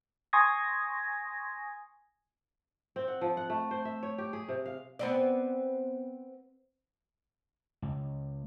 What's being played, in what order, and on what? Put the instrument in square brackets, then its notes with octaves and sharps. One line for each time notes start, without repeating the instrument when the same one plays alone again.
[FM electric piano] G#5 C6 C#6 D#6 G#6 A#6
[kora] C4
F#5
F3
F#5
A3
C5
E5
C#5
G4
G#4
C3
F5
[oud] B3 C4 D5
[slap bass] C#2